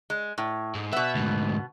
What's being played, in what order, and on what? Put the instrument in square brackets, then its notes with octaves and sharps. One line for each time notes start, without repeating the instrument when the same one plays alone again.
[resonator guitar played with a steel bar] G#3
A2
[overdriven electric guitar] G#2
[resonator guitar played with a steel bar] B2 B3 [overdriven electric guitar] E5
[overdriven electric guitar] D2 G#2